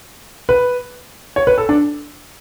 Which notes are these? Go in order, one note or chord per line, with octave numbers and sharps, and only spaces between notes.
B4
C#5
B4
A4
D4